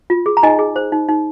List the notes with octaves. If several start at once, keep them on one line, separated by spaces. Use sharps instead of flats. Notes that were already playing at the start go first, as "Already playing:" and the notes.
F4
G#4
A#5
D#4 D#5 G#5
G#4
C5
D#4
D#4